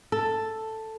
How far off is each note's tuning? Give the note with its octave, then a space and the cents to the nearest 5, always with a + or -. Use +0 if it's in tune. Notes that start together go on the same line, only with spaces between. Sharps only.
A4 +5